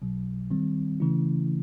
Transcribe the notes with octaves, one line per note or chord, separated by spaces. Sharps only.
B1 B2 F#3
D#3 G3 C4
C#3 E3 A3 C#4 E4